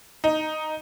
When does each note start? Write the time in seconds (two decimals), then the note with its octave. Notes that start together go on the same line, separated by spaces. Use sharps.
0.24 D#4